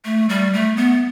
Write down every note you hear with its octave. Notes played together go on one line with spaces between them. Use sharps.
A3
G3
A3
B3